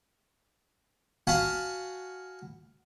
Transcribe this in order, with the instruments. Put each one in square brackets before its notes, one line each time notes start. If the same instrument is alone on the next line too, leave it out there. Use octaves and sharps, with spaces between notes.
[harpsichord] F#4 F5 F#5 G#5 A5 B5